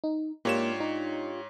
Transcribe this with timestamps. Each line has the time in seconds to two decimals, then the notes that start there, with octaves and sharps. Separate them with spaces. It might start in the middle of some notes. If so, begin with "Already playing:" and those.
0.04 D#4
0.45 G#2 A#3 D4 F4 G4 C#5 E7
0.80 D#4